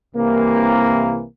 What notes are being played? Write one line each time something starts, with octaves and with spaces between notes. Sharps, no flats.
C2 C3 E3 A#3